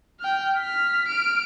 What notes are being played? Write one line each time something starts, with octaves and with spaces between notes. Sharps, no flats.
G5 F6
F6 B6
F6 D7